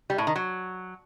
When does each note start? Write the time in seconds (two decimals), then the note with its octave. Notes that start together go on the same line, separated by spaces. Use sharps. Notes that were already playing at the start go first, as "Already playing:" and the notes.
0.10 G3
0.18 A2
0.27 D#3
0.36 F#3